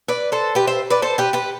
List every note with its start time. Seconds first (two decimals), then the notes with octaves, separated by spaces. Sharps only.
0.08 B4 D5
0.32 A4 C5
0.55 G4 B4
0.67 C5 E5
0.90 B4 D5
1.02 A4 C5
1.18 G4 B4
1.33 G4 B4